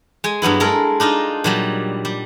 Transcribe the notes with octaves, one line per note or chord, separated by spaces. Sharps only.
G#3 G#5
G2 F#3 B3 E4
G#3 A4 A#4
D4 D#4 F4 D#5
A#2 F#3 G3
G3